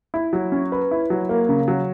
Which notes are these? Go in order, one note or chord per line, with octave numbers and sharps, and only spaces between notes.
E4
F#3
C#4
B4
E4
F#3
A#3
C#3
F#3